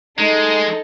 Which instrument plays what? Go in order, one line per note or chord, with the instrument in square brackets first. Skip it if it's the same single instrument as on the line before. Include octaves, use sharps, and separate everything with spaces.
[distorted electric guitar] G#3 [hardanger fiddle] D#4 A4